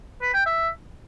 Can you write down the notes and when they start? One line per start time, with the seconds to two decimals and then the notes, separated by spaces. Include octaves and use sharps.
0.22 B4
0.34 G5
0.46 E5